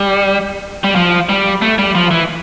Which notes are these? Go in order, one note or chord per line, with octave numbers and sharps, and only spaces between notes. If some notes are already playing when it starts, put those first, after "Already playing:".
Already playing: G3
G3
F3
G3
A3
G3
F3
E3